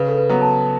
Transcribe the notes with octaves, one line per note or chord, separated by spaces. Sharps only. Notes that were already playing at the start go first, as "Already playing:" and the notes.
Already playing: C#3 B4
A4
B4
F#3 B3
A5